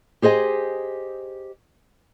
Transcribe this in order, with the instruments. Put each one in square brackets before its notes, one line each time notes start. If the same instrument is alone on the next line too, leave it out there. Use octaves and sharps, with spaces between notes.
[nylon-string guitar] G4 G#4 C5 D#5 G#5